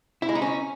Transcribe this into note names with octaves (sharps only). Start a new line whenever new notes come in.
E4
G#3
D#4
C#4